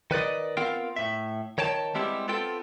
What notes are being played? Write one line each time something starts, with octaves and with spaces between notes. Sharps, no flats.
D#3 B4 D5 D#5
B3 C4 F4 A#4 F5 G5
A2 E5
D#3 C#5 G5 A5
G3 G#3 B3 C4 E4 G4
B3 C4 F4 A4 G5